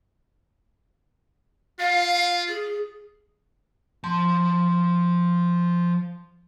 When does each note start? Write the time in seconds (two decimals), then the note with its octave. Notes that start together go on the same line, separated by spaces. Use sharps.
1.80 F4 F5
2.48 G#4
4.04 F3 A5 C6